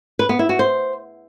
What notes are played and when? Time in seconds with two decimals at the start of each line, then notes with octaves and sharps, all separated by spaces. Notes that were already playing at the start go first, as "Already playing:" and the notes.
0.19 B4
0.29 B3
0.39 E4
0.49 F#4
0.59 C5